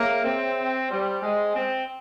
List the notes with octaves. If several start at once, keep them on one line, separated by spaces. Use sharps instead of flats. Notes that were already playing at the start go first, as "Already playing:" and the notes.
Already playing: A#3 G#4 C#5 E5
C4
G3 C5 G5 C6
G#3
C4